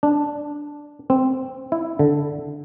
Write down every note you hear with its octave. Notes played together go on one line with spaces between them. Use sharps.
D4
C4
E4
D3